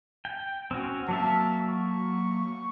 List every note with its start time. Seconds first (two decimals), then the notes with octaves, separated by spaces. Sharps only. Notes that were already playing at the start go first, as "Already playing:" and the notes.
0.25 G5
0.71 C4 C#4 F#4
1.09 F#3 A#3 E5 A5
1.61 C#6